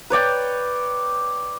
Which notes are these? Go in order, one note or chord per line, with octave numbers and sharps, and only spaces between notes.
B4 C#5 D5 G5